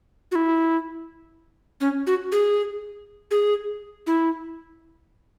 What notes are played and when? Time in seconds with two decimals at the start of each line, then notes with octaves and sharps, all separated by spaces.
0.32 F#4
0.35 E4
1.81 C#4
2.07 F#4
2.32 G#4
3.31 G#4
4.07 E4